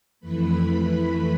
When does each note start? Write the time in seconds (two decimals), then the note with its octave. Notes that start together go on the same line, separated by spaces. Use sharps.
0.20 F2 E3 A3 B4 B5